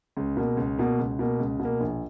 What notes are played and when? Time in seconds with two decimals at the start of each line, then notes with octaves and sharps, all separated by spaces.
0.17 C#2
0.37 B2 A#3
0.57 C#2
0.78 B2 A#3
0.99 C#2
1.19 B2 A#3
1.39 C#2
1.59 B2
1.65 A#3
1.80 A#1